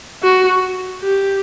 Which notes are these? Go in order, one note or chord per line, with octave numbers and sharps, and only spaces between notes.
F#4
G4